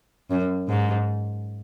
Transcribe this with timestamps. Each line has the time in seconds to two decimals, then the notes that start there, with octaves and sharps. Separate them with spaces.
0.31 F#2
0.69 G#2